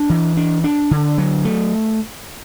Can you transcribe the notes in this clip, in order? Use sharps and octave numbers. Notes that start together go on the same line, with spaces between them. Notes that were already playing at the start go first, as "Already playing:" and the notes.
Already playing: D4
E3
D4
D4
D3
F#3
A3